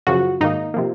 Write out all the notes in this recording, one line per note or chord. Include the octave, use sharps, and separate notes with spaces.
F#2 C#3 F3 F#4
G#2 D#3 A#3 D#4
C3 F3 A#3